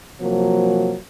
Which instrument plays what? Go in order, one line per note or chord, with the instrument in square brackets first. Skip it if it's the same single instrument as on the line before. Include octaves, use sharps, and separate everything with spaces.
[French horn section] C3 F3 F#3 A#3